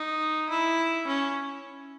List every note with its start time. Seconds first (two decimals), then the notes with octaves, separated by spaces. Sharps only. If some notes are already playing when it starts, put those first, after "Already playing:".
Already playing: D#4
0.50 E4
1.07 C#4